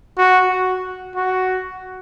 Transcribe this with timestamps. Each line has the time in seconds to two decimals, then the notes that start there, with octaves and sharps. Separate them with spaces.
0.18 F#4
0.50 F#4
1.16 F#4